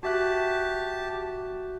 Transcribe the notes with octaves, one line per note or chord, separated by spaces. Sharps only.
F#4 G4 E5 A5 F#6